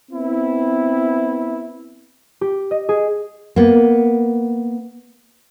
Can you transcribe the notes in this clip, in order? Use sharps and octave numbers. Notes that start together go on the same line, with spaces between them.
B3 C4 E4
G4
D#5
G#4
A#3 B3